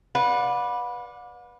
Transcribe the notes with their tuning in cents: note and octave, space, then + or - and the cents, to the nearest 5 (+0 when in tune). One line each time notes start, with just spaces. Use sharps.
B4 -10 D5 +0 F#5 -45